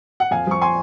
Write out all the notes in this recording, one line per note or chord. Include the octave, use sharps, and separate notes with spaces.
F#5
F2 F5 G#5
F3 C#6
G#5 C6